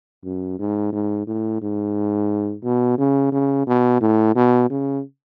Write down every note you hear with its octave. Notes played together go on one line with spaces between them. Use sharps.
F#2
G#2
G#2
A2
G#2
B2
C#3
C#3
B2
A2
B2
C#3